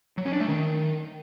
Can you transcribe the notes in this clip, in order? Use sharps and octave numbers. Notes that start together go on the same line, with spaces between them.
F#3
C#4
D4
A3
D#3